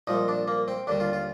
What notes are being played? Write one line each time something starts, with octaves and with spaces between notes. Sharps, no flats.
C2 A#2 F3 D#4
D4
A#3
C4
D#2 D3 G3 D4
F4
F4